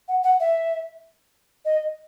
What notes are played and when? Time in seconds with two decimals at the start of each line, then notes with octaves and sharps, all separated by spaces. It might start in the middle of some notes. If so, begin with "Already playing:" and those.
0.08 F#5
0.24 F#5
0.40 E5
1.65 D#5